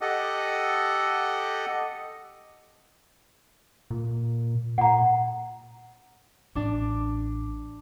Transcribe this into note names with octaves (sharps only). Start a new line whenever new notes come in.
G4 A4 D#5 F#5
A#2
A#2 F#5 A#5
A1 D4 D6